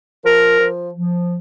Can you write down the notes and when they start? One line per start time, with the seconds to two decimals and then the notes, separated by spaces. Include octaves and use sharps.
0.25 F3 A#4
0.60 F3
0.94 F3